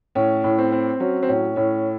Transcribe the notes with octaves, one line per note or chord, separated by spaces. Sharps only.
A2 C#4
A2
C4
C4
F#3 C#4
C4
A2 C#4
A2 C#4